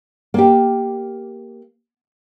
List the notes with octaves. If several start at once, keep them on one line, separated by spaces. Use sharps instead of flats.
A#3 G4